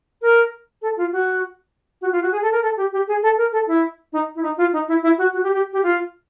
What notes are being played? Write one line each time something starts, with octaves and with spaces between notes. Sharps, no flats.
A#4
A4
F4
F#4
F#4
F4
F#4
G#4
A4
A#4
A4
G4
G4
G#4
A4
A#4
A4
E4
D#4
E4
D#4
F4
D#4
E4
E4
F#4
F#4
G4
G4
G4
F4